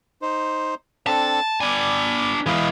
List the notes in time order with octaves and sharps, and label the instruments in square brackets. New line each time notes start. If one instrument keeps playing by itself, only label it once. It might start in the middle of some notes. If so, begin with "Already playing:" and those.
[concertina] D#4 C5
[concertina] C4 D4 A4 [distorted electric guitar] A5
[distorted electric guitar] D4 G#5 [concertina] D5 B5
[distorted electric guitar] E3 G#3 [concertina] B4 D#5 F5